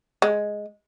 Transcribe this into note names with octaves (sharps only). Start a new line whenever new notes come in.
G#3